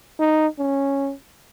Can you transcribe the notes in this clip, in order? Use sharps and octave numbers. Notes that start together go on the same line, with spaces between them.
D#4
C#4